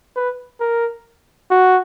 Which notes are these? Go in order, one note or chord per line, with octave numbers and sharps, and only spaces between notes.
B4
A#4
F#4